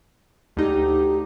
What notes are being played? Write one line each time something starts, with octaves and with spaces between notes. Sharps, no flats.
D2 D#4 G4